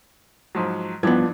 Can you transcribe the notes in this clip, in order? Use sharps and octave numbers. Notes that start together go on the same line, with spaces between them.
G#2 F3 F#3
A1 G2 F3 B3 D4 G#6